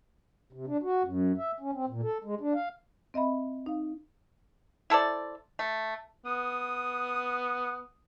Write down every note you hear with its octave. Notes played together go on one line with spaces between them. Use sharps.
C3
D4
F#4
F#2
E5
C#4
C4
A#2
A4
G#3
D4
F5
C4 D#5 E5 B5
D#4 F5
E4 A4 C5 D5
A3
B3 D#6